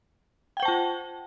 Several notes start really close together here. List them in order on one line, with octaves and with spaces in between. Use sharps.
G5 F#5 C5 A5 F4